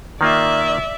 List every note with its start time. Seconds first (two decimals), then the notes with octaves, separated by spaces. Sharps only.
0.21 D#3 A#3 F4 D5 E5